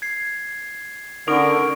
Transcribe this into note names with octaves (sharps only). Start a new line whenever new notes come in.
G#6 C7
D3 C#4 D#4 A#4 C#6 D7